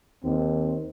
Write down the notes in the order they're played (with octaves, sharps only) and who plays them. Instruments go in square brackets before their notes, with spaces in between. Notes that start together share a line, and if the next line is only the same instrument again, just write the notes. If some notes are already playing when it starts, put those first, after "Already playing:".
[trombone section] D#2 D#3 C4